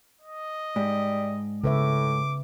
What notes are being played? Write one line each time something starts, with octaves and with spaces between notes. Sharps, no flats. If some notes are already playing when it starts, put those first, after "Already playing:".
D#5
G#2 G3
A2 C#3 B4 E5 D6